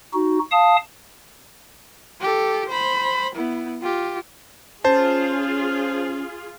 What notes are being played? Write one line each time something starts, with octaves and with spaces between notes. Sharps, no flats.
D#4 F#4
F5 A5 D#6
G4 A4
C5 B5
B3 E4
F4 G4
C#4 F4 G#4 C5 A5